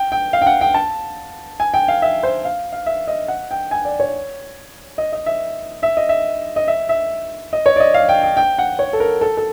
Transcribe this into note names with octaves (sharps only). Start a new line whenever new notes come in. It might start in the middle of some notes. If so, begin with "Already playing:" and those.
Already playing: G5
G5
F5
G5
F#5
G5
A5
G#5
G5
F5
E5
C5
F5
F5
E5
D#5
F#5
G5
G#5
D5
C#5
D#5
D#5
E5
E5
D#5
E5
D#5
E5
E5
D#5
C#5
D5
D#5
F5
G5
G5
G5
F#5
C#5
A4
A#4
A4
A4